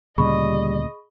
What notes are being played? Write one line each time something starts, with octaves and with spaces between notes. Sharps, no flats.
D2 A#2 C#3 G3 G#4 D#5 B5 C#6